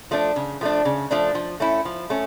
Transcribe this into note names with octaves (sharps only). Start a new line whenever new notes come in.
F3 A3 D4
C#3
F3 A3 D4
C#3
F3 A3 D4
F3
A3 C#4 E4
F3
A3 C#4